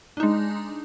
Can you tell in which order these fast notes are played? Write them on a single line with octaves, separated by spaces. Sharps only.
D4 D#4 G#3